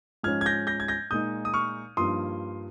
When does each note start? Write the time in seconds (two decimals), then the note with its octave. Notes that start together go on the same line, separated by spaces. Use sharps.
0.23 G#2 F3 G#3 C#4 F6 G#6
0.41 G#6
0.46 G6 A#6
0.67 G6 A#6
0.80 G#6
0.88 G6 A#6
1.11 A#2 G#3 D#4 D#6 G6
1.45 D#6
1.54 C#6 F6
1.97 G2 F3 A#3 D#4 C6 D#6